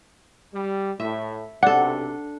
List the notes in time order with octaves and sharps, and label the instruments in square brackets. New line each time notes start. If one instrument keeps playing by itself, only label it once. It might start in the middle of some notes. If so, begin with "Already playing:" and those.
[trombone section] G3
[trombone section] A2 [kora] E5
[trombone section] B1 C3 [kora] D4 A4 [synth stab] F#5